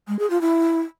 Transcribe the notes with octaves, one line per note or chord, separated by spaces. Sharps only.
G#3
G#4
F4
E4